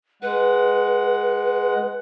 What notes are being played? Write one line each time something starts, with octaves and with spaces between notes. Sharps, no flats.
G#3 B4 F#5